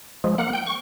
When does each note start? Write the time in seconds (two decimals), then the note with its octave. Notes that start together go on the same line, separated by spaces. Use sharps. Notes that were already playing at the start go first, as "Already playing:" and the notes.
0.24 F3 G#3
0.38 A#3 F#5
0.53 G5
0.66 C#6